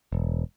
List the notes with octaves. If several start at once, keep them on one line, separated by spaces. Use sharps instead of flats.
E1